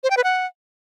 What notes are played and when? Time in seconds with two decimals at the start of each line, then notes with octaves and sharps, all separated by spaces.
0.04 C5
0.10 G5
0.17 B4
0.24 F#5